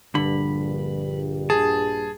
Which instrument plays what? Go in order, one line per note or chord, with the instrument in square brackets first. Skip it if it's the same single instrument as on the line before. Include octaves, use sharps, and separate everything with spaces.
[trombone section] A#1 G2 [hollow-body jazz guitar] D3 [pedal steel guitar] B5
[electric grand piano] G#4 [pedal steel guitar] A5